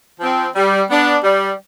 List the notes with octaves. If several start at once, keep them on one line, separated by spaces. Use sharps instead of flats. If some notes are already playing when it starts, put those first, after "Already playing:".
F3 C4
G3
B3 D4
G3